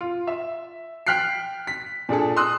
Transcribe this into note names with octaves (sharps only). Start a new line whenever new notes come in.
F4
E5
G5 F6 F#6 B6 C7
B6
A#2 D4 G#4 A4
C6 D#6 E6 F#6